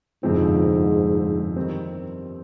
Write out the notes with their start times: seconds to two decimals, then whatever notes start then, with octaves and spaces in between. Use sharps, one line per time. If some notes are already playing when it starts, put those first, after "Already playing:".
0.23 G1 F2 G#2 C3 F3 C4
1.56 D#3 G3 C4